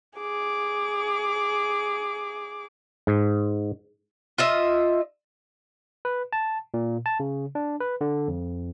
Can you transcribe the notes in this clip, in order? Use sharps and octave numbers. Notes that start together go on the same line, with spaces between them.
G#4 D6
G#2
F4 D#5 E5
B4
A5
A#2
A5
C#3
D4
B4
D3
F2